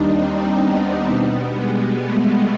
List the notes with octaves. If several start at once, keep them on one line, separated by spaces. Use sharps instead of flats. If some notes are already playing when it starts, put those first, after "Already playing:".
Already playing: D#2 D#3 G3 D4 D#4
C4
B3
B2 G3
G#3
A3